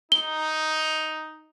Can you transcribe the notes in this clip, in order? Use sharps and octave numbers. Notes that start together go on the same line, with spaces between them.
D#4 G7